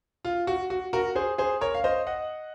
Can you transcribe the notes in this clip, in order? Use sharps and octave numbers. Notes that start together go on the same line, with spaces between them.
F4
F#4
F#4
F#4 A#4
G#4 C5
G#4 C5
A#4 C#5
F5
C5 D#5
D#5 F#5